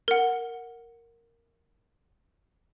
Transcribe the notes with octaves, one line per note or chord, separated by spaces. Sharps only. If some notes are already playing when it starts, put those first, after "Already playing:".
A#4 F#5